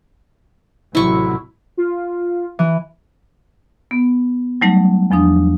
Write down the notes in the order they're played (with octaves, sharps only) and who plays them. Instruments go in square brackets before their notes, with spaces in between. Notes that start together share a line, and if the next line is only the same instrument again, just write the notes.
[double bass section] A1 C3 F#3 [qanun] E4 C#6
[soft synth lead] F4
[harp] E3
[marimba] B3
F#3 G3 A3 D#4
E2 F3 D4 D#6